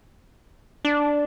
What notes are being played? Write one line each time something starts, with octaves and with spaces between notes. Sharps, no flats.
D4